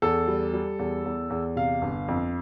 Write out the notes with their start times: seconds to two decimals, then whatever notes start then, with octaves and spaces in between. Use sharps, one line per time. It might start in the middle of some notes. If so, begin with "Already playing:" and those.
0.02 E2 A4
0.27 G3
0.53 G3
0.79 E2
1.05 E2
1.30 E2
1.56 C3 F5
1.82 G1
2.08 F2